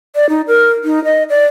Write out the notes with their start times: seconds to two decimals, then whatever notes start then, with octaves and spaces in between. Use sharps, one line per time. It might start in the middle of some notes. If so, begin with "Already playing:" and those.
0.16 D5
0.29 D#4
0.48 A#4
0.84 D#4
1.04 D#5
1.30 D5